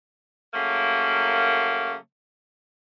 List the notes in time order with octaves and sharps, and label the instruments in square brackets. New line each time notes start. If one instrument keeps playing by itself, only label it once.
[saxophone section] C#3 F#3 A3 A#3